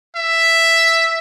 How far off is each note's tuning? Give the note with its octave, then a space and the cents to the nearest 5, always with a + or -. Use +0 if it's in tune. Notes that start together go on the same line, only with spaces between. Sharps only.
E5 +5